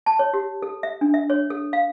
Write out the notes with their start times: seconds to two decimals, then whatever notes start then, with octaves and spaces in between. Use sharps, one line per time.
0.06 A5
0.19 C#5
0.34 G4
0.62 A4
0.83 E5
1.01 D4
1.14 E5
1.30 C#5
1.50 A4
1.73 F5